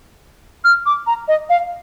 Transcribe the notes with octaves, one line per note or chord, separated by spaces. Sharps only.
F6
D6
A#5
D#5
F5